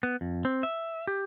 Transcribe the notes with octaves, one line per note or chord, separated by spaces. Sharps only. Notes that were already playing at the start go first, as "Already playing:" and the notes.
B3
F2
C4
E5
G4